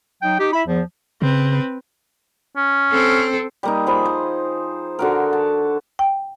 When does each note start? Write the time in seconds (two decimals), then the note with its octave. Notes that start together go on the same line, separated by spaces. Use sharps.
0.22 F#3 D#4 G5
0.39 D#4 G4
0.53 E4 E5 B5
0.67 E2 F3
1.22 C#3 C4 B4
2.56 C#4
2.91 C4 A4
3.63 G3 A#3 D#4
3.87 F3 G#4 B5
4.06 C5
4.99 D3 F#4 A#4
5.33 A5
5.99 G5